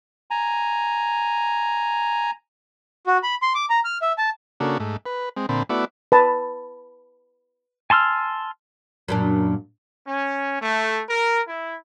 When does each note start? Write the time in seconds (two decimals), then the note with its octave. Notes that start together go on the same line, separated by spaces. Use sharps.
0.31 G#5 A#5
3.07 F#4
3.23 B5
3.42 C6
3.55 D6
3.70 A#5
3.85 F6
4.02 E5
4.18 A5
4.60 C#3 A#3 D4 F#4 A4
4.80 G#2 A3
5.06 B4
5.37 G#3 C4
5.49 A#2 D3 C4 A5 B5
5.69 A3 B3 E4 F#4 D5
6.12 B4 A5
7.90 G#5 A5 C6 E6 F6
9.08 F#2 A#2 D4
10.07 C#4
10.60 A3
11.08 A#4
11.48 E4